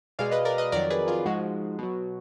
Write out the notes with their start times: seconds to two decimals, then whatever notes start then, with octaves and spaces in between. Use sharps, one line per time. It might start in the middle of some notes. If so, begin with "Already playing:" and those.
0.19 B2 G#3 D5 F5
0.31 B4 D#5
0.45 A#4 D5
0.58 B4 D#5
0.72 F2 D#3 F#3 A#4 D5
0.90 G#4 B4
1.07 F4 G#4
1.25 G#2 F3 G#3 F#4
1.79 B2 F#3